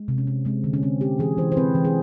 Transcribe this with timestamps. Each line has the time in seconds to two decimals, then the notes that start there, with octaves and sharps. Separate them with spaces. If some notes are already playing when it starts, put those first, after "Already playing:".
Already playing: G#3
0.08 C3
0.18 C#4
0.27 C4
0.45 G#3 C4
0.64 D3
0.73 C#4
0.83 C4
1.01 C4 G4
1.19 E3 G#4
1.38 E3 C5
1.52 C5
1.57 C4 B4
1.75 E3
1.85 G#4